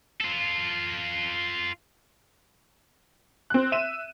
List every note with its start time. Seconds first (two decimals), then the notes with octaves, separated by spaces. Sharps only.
0.21 F4 A4
3.50 C4 F#6
3.72 E5 D#7 E7